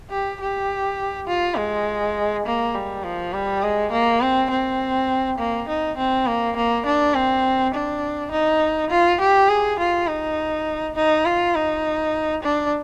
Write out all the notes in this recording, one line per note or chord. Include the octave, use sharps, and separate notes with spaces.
G4
G4
F4
G#3
A#3
G3
F3
G3
G#3
A#3
C4
C4
A#3
D#4
C4
A#3
A#3
D4
C4
D4
D#4
F4
G4
G#4
F4
D#4
D#4
F4
D#4
D4